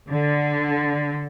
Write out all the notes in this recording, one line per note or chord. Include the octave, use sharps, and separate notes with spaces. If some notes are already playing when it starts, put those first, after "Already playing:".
D3